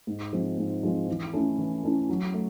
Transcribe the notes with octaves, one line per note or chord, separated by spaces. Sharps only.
G#2
F3 G#3 C4
G#2
F3 G#3 C4
E3
A3 C#4 E4 A4
E3
A3 C#4 E4 A4
F#3
A3